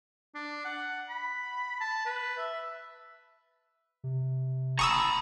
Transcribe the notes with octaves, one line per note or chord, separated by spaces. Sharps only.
D4
F#5
B5
A5
B4
E5
C3
F#1 A#5 B5 C#6 D#6 E6